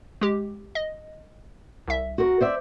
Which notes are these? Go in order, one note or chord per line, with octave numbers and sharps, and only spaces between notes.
G#3 G4
D#5
C2 E5
F#4 A#4
C5 D5 E5